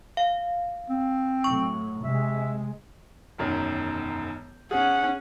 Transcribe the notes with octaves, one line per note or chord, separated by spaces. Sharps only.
F5
C4
A2 F#3 C#6
C3 G#3 E5
E1 F#2 D#3
C#4 G#4 F#5